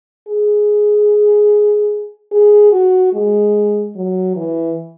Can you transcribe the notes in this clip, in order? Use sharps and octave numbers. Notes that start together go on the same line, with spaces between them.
G#4
G#4
F#4
G#3
F#3
E3